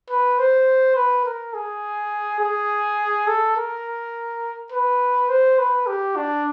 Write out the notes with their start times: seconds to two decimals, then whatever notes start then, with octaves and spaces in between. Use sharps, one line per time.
0.10 B4
0.39 C5
0.95 B4
1.25 A#4
1.54 G#4
2.40 G#4
3.27 A4
3.56 A#4
4.72 B4
5.29 C5
5.59 B4
5.87 G4
6.16 D4